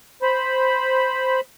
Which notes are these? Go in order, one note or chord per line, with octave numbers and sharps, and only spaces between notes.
C5 B5